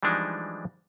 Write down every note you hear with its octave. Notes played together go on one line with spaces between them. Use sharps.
E3 F3 G3 G#3 D4 D#4